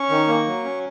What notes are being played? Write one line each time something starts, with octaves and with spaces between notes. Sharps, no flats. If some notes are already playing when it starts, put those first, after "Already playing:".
Already playing: C#4 C#6
D#3
A#3
F#3
C#4